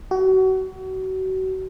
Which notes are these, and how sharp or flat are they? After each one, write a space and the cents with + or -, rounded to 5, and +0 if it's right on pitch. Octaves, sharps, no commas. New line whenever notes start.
F#4 +30